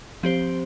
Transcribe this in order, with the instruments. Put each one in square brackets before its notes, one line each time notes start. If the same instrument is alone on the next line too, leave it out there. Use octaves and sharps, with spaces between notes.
[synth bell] F3 C4 G4 C5